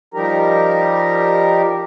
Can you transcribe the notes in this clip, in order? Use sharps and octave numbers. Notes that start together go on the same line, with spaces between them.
F3 G3 D#4 G4 A#4 A#5